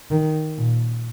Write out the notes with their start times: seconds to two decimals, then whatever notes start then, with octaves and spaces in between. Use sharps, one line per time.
0.11 D#3
0.58 A#2